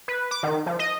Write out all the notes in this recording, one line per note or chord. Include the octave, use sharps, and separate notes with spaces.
B4
D6
D#3
F3
D#5